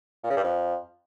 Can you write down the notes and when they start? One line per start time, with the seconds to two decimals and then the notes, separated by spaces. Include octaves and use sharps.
0.23 A#2
0.30 C#3
0.37 G2
0.43 F2